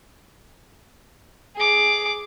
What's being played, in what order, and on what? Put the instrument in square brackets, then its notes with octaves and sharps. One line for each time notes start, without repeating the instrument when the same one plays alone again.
[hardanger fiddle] G#4 D6